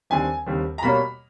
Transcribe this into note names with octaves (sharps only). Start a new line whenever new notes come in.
D#2 D3 G3 C4 G#5
D#2 D3 G3 C4
A#5
B2 G3 A#3 C#4 B5